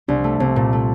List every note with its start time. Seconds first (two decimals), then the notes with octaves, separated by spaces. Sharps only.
0.08 C2 D4
0.24 A3
0.40 C2 C4
0.56 A#2
0.73 A3